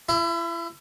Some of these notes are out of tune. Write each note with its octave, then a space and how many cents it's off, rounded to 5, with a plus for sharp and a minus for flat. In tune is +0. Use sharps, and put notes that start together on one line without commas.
E4 +35 E5 +0